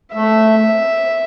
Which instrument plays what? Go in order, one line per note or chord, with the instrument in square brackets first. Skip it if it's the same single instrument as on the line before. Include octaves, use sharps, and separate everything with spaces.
[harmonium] A3 [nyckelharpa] E5